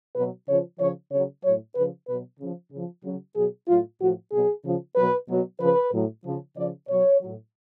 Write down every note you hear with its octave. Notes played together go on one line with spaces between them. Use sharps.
B2 F#3 B4
C#3 F3 C#5
C#3 F3 C#5
C#3 F#3 C#5
A2 F#3 C#5
C#3 F3 B4
B2 F#3 B4
C#3 F3
C#3
F3
C#3 F#3
B2 F#3 G#4
A2 F#3 F4
A2 F3 F#4
B2 F#3 G#4
C#3 F3
B2 F#3 B4
B2 F#3
C#3 F3 B4
A2 F#3
C#3 F3
C#3 F3 D5
B2 F#3 C#5
A2 F#3